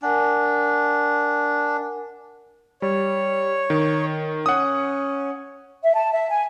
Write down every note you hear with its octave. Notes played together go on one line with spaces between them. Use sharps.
D4 A#4 F#5 G#5
G3 C#5
D#3
C#4 F#5 D#6
E5
A5
E5
G#5